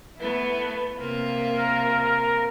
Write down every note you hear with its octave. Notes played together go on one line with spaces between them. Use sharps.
A3 B3 E4
C3 A#3 F4
A#4